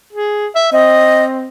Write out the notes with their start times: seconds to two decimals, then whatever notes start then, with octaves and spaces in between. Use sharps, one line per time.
0.13 G#4
0.55 E5
0.72 C4 D#5